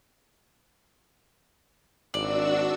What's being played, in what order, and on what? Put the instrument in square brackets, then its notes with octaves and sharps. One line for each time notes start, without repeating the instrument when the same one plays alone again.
[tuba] G#1 [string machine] D4 F#4 E6 [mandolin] D5